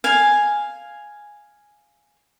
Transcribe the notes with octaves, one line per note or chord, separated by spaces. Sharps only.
F5 G#5